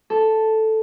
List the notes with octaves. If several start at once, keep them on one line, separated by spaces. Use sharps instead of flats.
A4